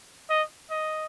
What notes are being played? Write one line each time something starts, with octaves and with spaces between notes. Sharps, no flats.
D#5
D#5